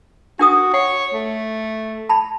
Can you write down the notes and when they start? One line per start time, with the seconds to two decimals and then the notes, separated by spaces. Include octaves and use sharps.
0.39 D4 F#4 A#4 D#6
0.74 C#5 F#5
1.14 A3
2.09 A5 B5